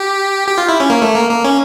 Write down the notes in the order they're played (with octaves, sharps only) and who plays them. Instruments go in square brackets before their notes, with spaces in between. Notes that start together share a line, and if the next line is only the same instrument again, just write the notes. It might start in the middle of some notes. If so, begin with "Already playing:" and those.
Already playing: [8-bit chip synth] G4
G4
F4
E4
C#4
A#3
A3
A#3
A#3
C#4